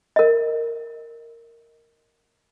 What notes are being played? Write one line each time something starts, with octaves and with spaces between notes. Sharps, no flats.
A#4 D#5